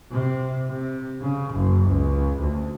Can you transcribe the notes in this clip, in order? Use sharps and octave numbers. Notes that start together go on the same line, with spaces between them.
C3
C3
C#3
F#1
C#2
D2